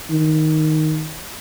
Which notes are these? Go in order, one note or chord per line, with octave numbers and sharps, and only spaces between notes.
D#3